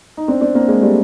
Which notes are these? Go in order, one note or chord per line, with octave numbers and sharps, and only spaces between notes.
D#4
C4 D4
C4 D4
A#3 C4
G#3 A#3
G3 A3